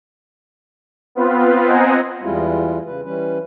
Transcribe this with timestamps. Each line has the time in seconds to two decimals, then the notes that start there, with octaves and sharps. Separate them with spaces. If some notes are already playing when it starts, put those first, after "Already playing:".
1.15 B3 C4 F4 B4
1.66 C4 C5 D#5 F#5 G#5 A#5
2.23 E2 G3 G#3 E4 F4
2.86 C#3 B4
3.04 E3 G3 C#4 B4